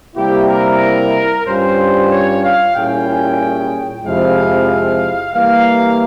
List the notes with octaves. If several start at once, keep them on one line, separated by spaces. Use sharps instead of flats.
C3 G3 A#3 E4 G4
A#4
G2 G3 C#4 F4 C5
C#5
F5
A#2 G3 C#4 E4 G#4 G5
F2 C3 F3 G#3 E4 F5
E3 G3 A#3 F5